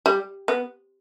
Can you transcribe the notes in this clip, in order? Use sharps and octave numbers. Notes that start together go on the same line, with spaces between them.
G3
B3